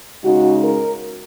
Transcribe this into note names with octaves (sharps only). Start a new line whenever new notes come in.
C#3 G#3 D#4 F#4
A#4